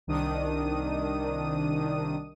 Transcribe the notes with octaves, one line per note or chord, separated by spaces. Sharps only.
C2 D#3 D4 D#6 D#7